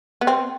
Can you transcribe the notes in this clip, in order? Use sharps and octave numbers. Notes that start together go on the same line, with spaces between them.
B3
C4